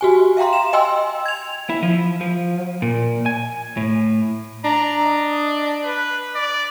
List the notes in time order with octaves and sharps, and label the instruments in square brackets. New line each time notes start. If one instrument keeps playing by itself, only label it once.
[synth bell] F#4 G4 G#5
E5 F5 G5 A#5 C6
E7
D#5 G5 G#5 C6 E6
G#6 F7
[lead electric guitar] E4
F3
F3
A#2
G#5
A2
[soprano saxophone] D4 [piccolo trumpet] A#5
[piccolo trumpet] D#5
B4
D5